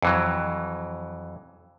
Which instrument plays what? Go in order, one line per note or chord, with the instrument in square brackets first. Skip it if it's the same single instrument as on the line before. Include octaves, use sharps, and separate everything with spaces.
[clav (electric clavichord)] F2 E3 F#3